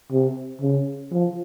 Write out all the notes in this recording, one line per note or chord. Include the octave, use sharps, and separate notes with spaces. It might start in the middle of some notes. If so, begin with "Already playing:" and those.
C3
C#3
F3